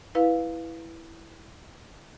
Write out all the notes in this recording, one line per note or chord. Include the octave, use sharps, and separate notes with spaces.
E4 B4 F5